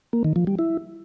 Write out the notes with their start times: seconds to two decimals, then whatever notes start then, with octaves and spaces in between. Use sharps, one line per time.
0.13 A#3
0.24 D#3
0.36 F3
0.47 G3
0.59 E4